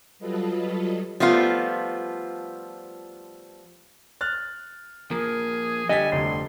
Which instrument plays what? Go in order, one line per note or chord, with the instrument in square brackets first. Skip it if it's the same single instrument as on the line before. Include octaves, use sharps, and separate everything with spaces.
[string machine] F#3 G3 F4 A4 B4 D#5
[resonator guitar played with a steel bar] F3 G3 A3 B3 F4
[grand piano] F6 F#6 A6
[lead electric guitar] F3 A#3 [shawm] G#4 [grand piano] A#4
[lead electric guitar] D3 G4 [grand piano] G3 A6 B6 [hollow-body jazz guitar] D#5 [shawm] G#5
[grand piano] F1 D3 G3 [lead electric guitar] D2 [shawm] C6